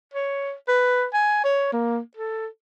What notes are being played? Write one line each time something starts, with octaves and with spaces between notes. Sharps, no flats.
C#5
B4
G#5
C#5
A#3
A4